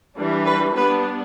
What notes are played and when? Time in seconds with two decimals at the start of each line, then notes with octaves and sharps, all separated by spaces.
0.17 E3 G3 D4
0.46 B4
0.75 G3 B3 D4 B4